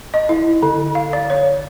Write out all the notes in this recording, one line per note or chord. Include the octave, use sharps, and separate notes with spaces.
D#5
E4
D3
F5
D5
C#5